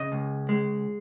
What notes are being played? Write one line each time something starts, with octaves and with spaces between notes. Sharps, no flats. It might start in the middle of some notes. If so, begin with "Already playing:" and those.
Already playing: C#3 D#5
C#2
G#3